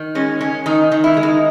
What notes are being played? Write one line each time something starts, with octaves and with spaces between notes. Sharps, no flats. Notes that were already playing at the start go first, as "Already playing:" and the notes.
Already playing: D#3
G#3 C#4
G#3 C#4
D#3 D#4
D#3
E4
G#3
D#4